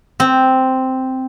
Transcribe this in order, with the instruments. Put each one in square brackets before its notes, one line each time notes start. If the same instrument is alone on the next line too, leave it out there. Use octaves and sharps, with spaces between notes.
[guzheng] C4